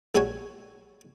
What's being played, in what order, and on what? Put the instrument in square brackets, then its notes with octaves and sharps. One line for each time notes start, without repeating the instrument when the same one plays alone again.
[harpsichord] A#1 G3 F#4 C#5 F#5 G#5